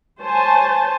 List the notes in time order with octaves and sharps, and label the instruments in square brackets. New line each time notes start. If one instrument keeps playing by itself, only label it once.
[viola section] C5 C#5 G#5 A5